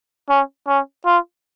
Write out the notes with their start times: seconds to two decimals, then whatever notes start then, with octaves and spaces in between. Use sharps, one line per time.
0.30 C#4
0.68 C#4
1.06 F4